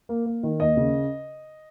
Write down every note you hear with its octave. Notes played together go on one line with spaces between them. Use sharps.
A#3
A#3
D#3
D#2 D#5
C#3